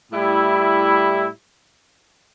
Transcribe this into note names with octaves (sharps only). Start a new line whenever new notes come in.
A2 G3 E4